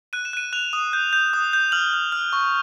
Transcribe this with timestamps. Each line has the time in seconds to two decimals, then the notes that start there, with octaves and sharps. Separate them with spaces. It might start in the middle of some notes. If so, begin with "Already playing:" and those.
0.13 F#6 D#7
0.25 E7
0.33 F#6 D#7
0.53 F#6 F7
0.73 D#6
0.93 G6
1.13 G6
1.33 D#6
1.53 G6
1.72 F6 F#7
1.93 F6
2.12 F6
2.33 C#6